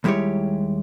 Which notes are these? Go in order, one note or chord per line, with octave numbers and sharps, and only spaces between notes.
D#2 G3 G#3 E4 G4 C#5